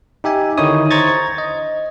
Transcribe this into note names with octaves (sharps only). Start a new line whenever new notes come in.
D#4 G4 E5 G#5
D3 D#3 D#4 E4 C#5 D#6
C5 A#5 C#6 G#6 A6
D#5